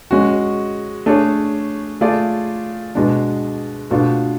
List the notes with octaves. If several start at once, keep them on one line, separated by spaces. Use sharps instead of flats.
G#3 C#4 F#4
A3 D4 G#4 C#5
A3 F4 G#4 D5
B2 G#3 D4
B2 A3 D4 F4